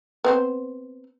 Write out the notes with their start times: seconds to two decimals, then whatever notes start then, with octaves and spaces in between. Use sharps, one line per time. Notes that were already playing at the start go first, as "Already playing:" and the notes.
0.24 B3 C4 C5